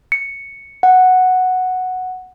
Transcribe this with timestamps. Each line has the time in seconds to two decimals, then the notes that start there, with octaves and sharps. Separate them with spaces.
0.12 C#7
0.83 F#5